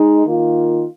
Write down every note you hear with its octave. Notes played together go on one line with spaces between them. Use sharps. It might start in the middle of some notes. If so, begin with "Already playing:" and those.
Already playing: G#3 D#4
D#3 A#3 F4